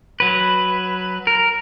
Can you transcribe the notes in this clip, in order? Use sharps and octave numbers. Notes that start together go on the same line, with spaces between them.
F#3 B4
A#4